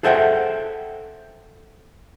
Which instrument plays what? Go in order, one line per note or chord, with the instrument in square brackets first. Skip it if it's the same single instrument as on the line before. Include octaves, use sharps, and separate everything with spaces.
[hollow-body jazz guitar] G#4 A4 C5 E5 F#5 G5